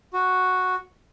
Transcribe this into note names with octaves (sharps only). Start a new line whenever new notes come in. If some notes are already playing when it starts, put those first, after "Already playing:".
F#4